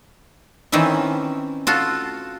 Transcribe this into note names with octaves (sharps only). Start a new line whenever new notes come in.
D#3 E3 C4 C#4 E4
F4 F#4 A4